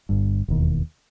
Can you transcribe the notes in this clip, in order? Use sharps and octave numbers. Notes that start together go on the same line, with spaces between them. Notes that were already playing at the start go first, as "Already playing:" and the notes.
G1 G2
E1 D#2